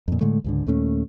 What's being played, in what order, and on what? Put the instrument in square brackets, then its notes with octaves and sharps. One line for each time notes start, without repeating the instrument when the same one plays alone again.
[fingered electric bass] F2 A#2
A2 D3 G#3 A3
C#2 G#2 D3
D#2 A#2 A3 C#4